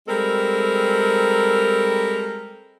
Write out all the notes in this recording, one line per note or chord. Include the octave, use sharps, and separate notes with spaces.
G3 G#3 C4 A4 A#4